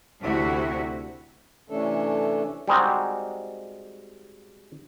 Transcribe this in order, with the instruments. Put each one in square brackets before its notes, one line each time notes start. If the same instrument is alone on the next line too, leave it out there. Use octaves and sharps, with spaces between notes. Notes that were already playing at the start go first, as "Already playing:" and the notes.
[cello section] D2 C3 E4 F#4
[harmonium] C3 E3 A3 C#4 D4 A4
[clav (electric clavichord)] G3 G#3 C4 D#4 F#4